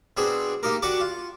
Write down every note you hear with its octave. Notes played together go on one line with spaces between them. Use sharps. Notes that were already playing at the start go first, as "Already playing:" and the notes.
B2 C4 D4 G#4 G5
A#3 D#4 G4 A#4
D4 F#4 G4 A5 C#6 D6
F4